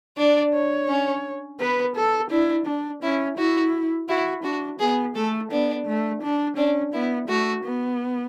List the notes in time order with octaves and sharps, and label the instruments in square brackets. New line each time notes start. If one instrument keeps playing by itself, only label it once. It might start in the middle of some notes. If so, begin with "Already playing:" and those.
[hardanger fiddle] D4 [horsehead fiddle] D5
[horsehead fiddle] C#5
[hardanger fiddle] C#4
[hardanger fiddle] B3 [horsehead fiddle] B4
[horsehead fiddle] A4
[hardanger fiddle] D4 [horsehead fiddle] E4
[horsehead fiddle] D4
[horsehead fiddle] C#4 [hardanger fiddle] E4
[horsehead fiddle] E4 [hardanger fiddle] F#4
[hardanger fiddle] E4 [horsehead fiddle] F#4
[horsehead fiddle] D4 [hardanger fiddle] F#4
[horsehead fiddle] B3 [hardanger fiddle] G#4
[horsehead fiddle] A3 [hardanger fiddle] A4
[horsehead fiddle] B3 [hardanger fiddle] D4
[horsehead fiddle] A3
D4
[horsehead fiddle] C#4 [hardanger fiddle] D4
[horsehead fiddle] B3 [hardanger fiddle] E4
[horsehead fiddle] A3 [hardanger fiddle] F#4
[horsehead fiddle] B3